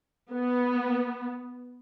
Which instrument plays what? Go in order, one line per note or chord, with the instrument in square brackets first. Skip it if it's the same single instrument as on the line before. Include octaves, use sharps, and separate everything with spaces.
[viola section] B3